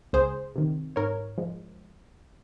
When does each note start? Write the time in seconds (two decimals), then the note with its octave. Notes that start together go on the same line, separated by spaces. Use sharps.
0.13 C#2 G#4 C5
0.56 C3 D#3
0.96 G#2 A#4 C#5
1.38 F3 G#3